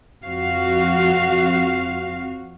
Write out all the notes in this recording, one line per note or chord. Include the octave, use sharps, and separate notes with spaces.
F2 C4 F#4 F5